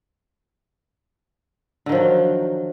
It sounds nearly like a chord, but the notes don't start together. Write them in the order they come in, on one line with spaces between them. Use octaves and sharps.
D3 D#3 F3 F#3